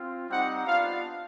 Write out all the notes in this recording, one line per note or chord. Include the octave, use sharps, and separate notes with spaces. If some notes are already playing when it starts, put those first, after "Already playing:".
Already playing: C4 F4
G3 C4 D#4 G4 F#5
B3 D4 F4 F5